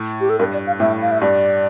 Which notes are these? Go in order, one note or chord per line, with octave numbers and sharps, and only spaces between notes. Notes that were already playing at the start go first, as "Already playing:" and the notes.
Already playing: A2
G4
A4
G2 A#4
D5
F5
A2 E5
F5
E5
G2 D5